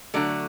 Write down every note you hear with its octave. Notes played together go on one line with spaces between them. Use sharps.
D3 F#3 A3 D5